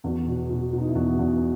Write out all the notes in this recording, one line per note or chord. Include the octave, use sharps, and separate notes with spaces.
E2 F#4
B2
B2
B2
D#4
E4
E2 F#4
E2